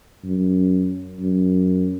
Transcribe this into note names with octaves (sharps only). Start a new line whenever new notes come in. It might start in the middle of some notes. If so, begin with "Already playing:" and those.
F#2
F#2